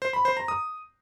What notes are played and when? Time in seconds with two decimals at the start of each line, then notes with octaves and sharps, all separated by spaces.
0.02 C5
0.13 B5
0.25 C5
0.37 A#5
0.48 D#6